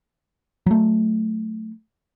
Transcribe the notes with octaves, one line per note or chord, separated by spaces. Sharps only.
F#3 A3